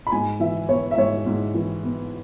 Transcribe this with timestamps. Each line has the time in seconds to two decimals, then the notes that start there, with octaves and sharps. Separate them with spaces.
0.07 B5
0.12 G#2 G#5
0.40 E3 E5
0.69 B3 C#5
0.91 E5
0.97 G#2 C#5
1.26 G#2
1.55 E3
1.83 B3